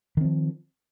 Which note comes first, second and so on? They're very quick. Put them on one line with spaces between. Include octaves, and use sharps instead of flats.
D#3 C4 F3